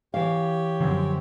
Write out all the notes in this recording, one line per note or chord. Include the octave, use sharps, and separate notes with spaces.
E3 G4 C#5 F5
F#2 D3 F3 F#3 C4